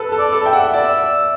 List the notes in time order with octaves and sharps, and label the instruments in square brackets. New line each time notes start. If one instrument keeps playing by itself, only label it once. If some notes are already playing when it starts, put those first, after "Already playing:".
Already playing: [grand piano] A4 B4
A4
[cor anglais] D5
[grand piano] A4
[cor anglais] E5 [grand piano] G5
[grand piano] F#5
D5